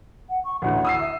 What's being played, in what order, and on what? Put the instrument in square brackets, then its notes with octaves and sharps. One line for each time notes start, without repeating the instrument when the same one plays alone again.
[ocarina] F#5
C#6
[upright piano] A1 D2 [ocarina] F#5
[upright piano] D#6 E6 C7
[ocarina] E5